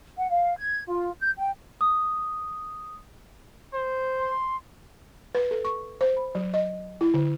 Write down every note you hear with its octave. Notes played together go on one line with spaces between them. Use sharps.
F#5
F5
G#6
F4
G6
G5
D#6
C5
C6
B4
A4
C#6
C5
B5
F#3
D#5
E4
D3